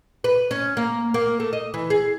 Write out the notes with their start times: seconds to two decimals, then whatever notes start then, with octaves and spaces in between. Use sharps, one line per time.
0.24 B4
0.51 C#4
0.77 A#3
1.14 A#3
1.40 A3
1.53 D#5
1.74 E3
1.90 G#4